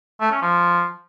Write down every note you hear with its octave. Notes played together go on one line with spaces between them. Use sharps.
A3
C#4
F3